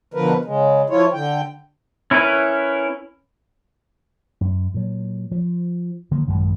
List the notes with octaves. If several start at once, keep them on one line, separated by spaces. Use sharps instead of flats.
B2 D3 F3 A#4 B4
C#3 G#3
F3 E4 F4 C#5
D3 G5
C#4 E4 A#4 B4
F#2
A#2 F#3
F3
D3 D#3 F#3 A#3
A1 F#2 D#3 G#3